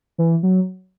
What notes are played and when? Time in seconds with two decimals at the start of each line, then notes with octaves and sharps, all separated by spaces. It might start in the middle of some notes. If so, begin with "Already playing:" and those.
0.18 E3
0.43 F#3